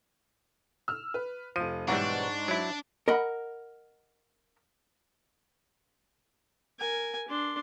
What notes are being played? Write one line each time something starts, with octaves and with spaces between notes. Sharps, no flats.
E6 F6
B4
F1 F3 D#7
B1 G#2 E3 G3 D4 F#5 C#6
F#3 E4
A#4 D#5 F#5 B5
A#4 G#5
D4 C6